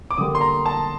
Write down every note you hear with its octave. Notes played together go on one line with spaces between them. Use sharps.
D6
D3 G3 A#3 D#6
C6
A#5
A5